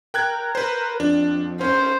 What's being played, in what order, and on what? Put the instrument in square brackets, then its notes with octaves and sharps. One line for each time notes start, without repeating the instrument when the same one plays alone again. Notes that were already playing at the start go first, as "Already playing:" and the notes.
[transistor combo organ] A#4 [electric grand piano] G5 F#6 G#6
[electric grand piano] B4 C5
[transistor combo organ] F2 [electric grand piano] D4
[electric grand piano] C#4 [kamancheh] C5